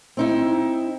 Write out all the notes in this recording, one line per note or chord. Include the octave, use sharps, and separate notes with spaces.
C4 D#4 E4